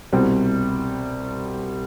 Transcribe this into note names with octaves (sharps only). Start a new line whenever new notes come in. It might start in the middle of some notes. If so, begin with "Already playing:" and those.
C2 B2 G3 C4